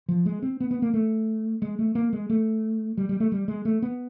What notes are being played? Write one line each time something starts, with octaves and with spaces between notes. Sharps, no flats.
F3
G#3
C4
B3
B3
A#3
A3
G#3
A3
A#3
G#3
A3
G3
G3
A3
G3
G#3
A3
B3